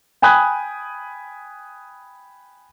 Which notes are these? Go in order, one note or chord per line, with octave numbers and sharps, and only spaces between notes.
G5 G#5 B5 D#6 F#6 G#6